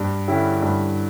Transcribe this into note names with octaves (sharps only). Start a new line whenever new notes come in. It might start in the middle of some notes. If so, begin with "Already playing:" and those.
Already playing: G2
D3 G3 C#4 E4
G2